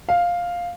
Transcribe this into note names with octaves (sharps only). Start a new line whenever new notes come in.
F5